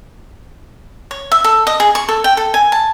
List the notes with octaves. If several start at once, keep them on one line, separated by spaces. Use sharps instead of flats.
C#5
E5
A4
D#5
G#4
C#6
A4
G5
A4
G#5
A5